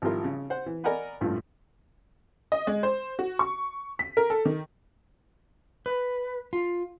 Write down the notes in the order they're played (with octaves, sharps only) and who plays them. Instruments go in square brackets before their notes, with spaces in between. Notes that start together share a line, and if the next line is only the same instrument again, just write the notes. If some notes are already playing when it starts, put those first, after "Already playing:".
[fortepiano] G#1 F3 G3 E4 F4 A#4
C#3
C5 F#5
E3
A#4 D5 D#5 F#5 G#5 B5
A1 G2 A#2 F3 A3
[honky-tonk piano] D#5
G#3
C5
F#4
C#6
B6
A#4
A4
D#3
[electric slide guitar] B4
F4